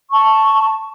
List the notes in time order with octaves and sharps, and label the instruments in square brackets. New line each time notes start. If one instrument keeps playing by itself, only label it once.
[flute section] A5 C#6